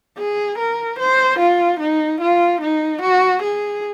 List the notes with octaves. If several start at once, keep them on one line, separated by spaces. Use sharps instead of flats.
G#4
A#4
C5
F4
D#4
F4
D#4
F#4
G#4